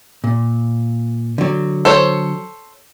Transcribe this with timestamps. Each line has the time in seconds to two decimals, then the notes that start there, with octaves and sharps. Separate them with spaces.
0.24 A#2
1.38 D3 F#3
1.85 A4 C5 C#5